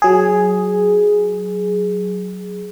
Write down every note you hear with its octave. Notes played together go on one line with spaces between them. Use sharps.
F#3 G#4